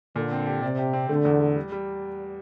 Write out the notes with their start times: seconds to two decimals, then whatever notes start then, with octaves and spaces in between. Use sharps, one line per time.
0.16 A#2 D3
0.32 C4
0.47 G4
0.62 C3 D5
0.79 G4
0.93 C4
1.09 D3 A3
1.25 E2
1.40 A3
1.56 G3
1.72 G3